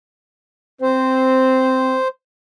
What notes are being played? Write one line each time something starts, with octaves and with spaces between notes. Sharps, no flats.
C4 C5